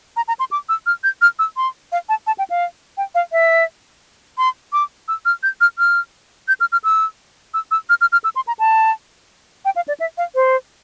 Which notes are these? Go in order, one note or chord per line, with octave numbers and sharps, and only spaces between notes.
A#5
A#5
C6
D6
E6
F6
G6
F6
E6
C6
F5
A5
A5
G5
F5
G5
F5
E5
C6
D6
E6
F6
G6
F6
F6
G6
F6
F6
E6
E6
E6
F6
F6
F6
E6
C6
A#5
A5
G5
F5
D5
E5
F5
C5